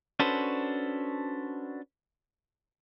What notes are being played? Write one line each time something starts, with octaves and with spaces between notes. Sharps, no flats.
C#4 D4 F#4 A4 B4 C5